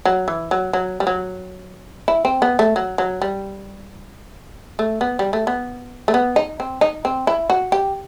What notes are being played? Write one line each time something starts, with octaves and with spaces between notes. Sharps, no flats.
F#3
E3
F#3
F#3
G3
F#3
E4
C4
B3
A3
F#3
F#3
G3
A3
B3
G3
A3
B3
A3
B3
D#4
C4
D#4
C4
E4
F#4
G4